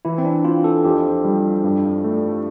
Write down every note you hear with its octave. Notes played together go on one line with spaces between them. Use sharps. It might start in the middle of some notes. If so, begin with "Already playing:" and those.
E3 E4
C4
D4
C4 F4
A4
F2 G4
G3
G2
A3